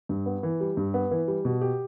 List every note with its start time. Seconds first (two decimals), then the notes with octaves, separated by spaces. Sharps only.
0.09 G2
0.26 B3
0.43 E3
0.60 G3
0.77 G2
0.94 B3
1.11 E3
1.28 G3
1.45 B2
1.61 G4